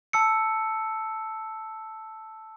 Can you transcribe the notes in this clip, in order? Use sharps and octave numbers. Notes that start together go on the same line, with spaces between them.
A5 E6 C#7